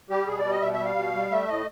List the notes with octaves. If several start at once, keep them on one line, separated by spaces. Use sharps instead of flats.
G3 G4
B2 G#4
D5
G3
D#5
B2 E5
E5
G3
F5
B2
G3
A3 E5
A2 D#5